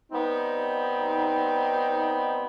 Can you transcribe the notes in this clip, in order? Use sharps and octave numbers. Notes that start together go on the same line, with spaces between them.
G3 B3 C4 D#4